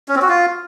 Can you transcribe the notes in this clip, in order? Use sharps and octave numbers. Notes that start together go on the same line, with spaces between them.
C#4
C4
F#4
F4